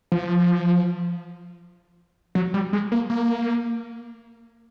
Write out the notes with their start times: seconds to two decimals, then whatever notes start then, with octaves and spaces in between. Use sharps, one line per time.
0.12 F3
2.35 F#3
2.54 G3
2.73 G#3
2.92 A#3
3.10 A#3